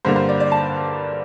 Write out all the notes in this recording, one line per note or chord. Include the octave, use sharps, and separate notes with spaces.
G2 D3 G3 A#3 C5
C5
D5
D5
A5